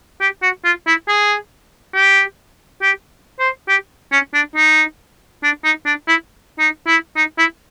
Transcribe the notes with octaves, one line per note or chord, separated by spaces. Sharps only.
G4
F#4
F4
E4
G#4
G4
G4
C5
G4
C#4
D4
D#4
D4
D#4
D4
E4
D#4
E4
D#4
E4